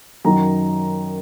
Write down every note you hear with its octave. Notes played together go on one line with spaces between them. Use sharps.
F#2 D#3 F#3 D#4 A#5